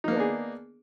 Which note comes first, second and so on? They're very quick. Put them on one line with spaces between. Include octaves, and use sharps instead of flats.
D#4 A#3 B3 D4 G#4